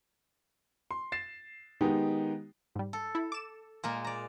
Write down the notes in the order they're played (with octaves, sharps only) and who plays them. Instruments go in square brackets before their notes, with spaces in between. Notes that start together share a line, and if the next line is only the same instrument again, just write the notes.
[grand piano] C6
A6 C7 E7
D#3 G#3 B3 D#4 G4
[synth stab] G#2 G3
[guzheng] A4
[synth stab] E4
D6 E7
[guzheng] A#2 G#3 A#3
D5 A#5